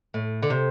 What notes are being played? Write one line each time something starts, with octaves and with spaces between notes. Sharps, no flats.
A2
D3
C3